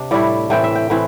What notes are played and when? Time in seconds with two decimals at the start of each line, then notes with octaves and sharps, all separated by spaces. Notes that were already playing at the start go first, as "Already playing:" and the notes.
Already playing: C3 D4
0.11 A2 G3 E4 D5
0.50 A2 E3 C4 G5
0.64 E5
0.75 G5
0.90 A2 E3 C4